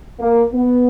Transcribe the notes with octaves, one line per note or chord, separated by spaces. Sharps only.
A#3
B3